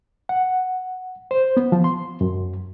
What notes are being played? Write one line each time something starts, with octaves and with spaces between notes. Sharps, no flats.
F#5
C5
B3
F3
C6
F#2